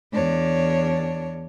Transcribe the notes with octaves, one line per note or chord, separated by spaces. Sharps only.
E2 D4 C#5